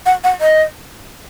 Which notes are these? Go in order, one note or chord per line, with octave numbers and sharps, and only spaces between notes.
F#5
F#5
D#5